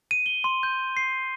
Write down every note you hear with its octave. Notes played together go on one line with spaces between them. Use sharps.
D#7
G7
C6
G6
C7